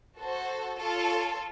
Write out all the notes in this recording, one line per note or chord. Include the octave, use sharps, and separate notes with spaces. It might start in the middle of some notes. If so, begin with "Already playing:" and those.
F#4 A4 C5
F4 A4 C#5